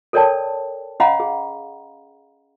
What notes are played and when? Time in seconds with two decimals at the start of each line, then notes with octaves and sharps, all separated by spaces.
0.13 A4 A#4 C#5 D5 G5 A5
1.00 C#4 D#5 F5 F#5 A#5 B5
1.20 G#4